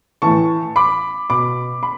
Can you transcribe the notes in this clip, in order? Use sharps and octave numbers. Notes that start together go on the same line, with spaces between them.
A2 E3 A5 C#6
B5 D6
B2 B5 D6
B5